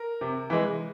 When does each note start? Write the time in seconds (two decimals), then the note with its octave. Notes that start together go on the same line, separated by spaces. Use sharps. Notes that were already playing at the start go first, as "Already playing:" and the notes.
Already playing: A#4
0.21 C3
0.50 E3 G#3